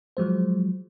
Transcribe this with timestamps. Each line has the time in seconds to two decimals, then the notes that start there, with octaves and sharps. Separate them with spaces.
0.17 F3 F#3 G#3 C5